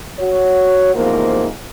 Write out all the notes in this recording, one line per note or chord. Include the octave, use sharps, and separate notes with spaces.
F#4 C#5
E2 G#2 C3 F3 A#3